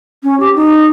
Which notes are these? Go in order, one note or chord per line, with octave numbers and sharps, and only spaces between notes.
C#4
G4
D#4